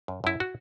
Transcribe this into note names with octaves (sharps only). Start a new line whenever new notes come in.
F#2
F#2 E4
F#4